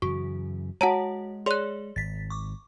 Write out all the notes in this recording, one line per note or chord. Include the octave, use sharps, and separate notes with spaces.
F#2 C#3 E3 F#4 C#6
G#3 F#4 C#5 F#5 A5 A#5
G#4 C#5 D5 C6 F#6
G#1 A6 B6
C#6 D6